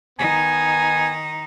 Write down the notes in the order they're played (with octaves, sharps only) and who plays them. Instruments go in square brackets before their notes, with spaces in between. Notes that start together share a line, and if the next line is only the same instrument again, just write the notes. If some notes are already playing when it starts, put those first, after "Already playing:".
[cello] D#3 D#4 [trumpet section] B3 G#5